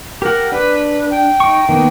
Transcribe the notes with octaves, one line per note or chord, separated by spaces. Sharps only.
G4 A#4 F#5
D4 B4
G5
D#4 C#6
D#3 A#3 B3